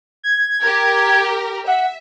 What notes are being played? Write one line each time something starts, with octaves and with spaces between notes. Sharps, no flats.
G#6
G4 A#4
E5 F#5